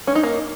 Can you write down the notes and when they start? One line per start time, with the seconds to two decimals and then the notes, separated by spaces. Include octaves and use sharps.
0.07 C#4
0.15 D#4
0.23 A#3